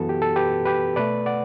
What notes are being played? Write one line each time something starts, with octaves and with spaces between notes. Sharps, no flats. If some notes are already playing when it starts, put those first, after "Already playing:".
Already playing: F#2 E3 B3 F#4 A4
G4
A4
G4 B4
G4 B4
B2 A3 B4 D5
D5 F#5